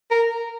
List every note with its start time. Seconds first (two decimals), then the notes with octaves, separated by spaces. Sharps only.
0.11 A#4